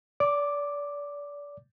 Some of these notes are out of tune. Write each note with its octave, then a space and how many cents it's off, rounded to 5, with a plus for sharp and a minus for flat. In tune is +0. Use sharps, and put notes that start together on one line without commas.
D5 -30 D6 +0